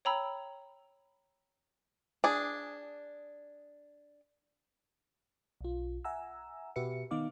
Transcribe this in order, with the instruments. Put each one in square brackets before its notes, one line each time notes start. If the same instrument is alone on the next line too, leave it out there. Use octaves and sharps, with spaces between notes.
[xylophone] C#5 G5 A#5 B5 E6
[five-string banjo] D4 G#4
[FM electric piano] B1 F4
E5 F#5 G#5 A#5 E6
B2 F#4 G4 B4 E5 C#7
D#3 B3 D#4 F5 D6